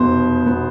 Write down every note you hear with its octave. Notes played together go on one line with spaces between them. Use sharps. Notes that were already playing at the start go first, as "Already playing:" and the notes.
Already playing: F1 E2 B2 B3 C5
B2 B3